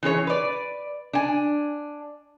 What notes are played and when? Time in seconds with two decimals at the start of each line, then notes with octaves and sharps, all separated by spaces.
0.03 E3 C#4 G#4 C#5
0.27 B4 D5
1.13 D4 G#5